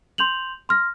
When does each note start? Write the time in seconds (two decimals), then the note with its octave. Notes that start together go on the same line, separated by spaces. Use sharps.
0.18 C6 G6 F7 F#7
0.69 C6 F6 A#6